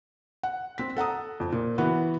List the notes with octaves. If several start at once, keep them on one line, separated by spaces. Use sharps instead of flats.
F#5
C4 B6
A4 F#5 A#5 D#6
F2
A#2
E3 B3 F#4